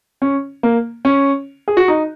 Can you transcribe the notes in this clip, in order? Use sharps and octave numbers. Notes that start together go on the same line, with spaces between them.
C#4
A#3
C#4
G#4
F#4
D#4